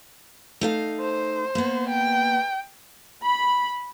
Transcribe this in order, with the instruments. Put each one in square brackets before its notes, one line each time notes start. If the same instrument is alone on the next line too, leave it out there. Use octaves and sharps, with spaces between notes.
[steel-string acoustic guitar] A3 D#4 F5
[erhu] C5
[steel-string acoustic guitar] A#3 B3
[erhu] G5
[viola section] B5